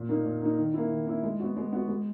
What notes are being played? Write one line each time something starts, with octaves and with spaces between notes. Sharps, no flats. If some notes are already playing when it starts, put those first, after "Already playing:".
Already playing: A#2
A#3 D#4
A#2
A#3 D#4
D#3
A#3 E4
D#3
A#3 E4
G#3
B3 F#4
G#3
B3 F#4
G#3